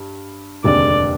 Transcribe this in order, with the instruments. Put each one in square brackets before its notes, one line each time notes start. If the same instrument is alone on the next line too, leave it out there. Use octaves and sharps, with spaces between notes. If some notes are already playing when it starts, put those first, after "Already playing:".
Already playing: [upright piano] G2
[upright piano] F1 D#2 D3 G#3 [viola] D5